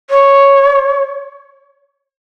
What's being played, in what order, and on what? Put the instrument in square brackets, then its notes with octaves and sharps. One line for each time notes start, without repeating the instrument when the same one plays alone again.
[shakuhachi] C#5